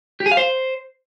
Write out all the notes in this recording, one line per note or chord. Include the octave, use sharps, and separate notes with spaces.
G4
G#4
F5
C5